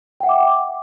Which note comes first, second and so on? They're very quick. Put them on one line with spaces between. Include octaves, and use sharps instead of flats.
G5 F#5 E5 D6